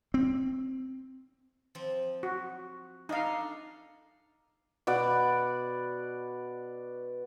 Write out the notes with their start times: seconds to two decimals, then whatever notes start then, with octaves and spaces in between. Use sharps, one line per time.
0.14 C4
1.75 F3 C4
2.23 F#4
3.09 D4 D#4 A4 D#5 F5
4.87 B2 D5 F#5